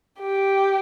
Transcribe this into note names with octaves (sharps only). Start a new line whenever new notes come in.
G4